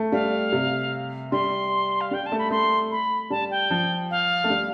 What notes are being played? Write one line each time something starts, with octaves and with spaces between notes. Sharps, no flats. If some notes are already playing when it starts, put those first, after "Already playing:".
Already playing: A3
G3 F5
C3
G3 C6
F5
G3
G5
A5
A3
B5
A3 C6
B5
G3 A5
G5
F3
F5
A3
G3